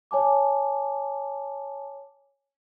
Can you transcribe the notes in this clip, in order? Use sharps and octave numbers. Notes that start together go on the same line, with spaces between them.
C#5 G#5 A5 D6